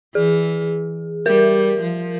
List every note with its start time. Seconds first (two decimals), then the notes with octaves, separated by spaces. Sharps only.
0.15 E3 G#4
1.26 G3 A#4
1.81 F3